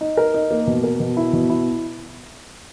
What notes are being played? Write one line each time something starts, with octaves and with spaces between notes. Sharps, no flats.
D#4
A#4
D#4
A#3
B2
A#4
B2
E4
B2
E4